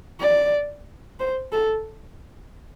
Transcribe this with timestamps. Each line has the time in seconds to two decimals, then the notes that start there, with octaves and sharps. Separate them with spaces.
0.20 D5
1.20 C5
1.52 A4